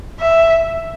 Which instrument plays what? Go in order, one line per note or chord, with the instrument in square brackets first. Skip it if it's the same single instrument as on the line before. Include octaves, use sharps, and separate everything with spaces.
[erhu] E5